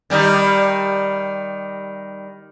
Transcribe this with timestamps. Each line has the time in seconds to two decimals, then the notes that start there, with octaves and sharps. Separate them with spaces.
0.10 D#3 G3 D#4